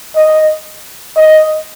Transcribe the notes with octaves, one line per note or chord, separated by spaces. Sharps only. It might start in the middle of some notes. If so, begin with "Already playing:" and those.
D#5
D#5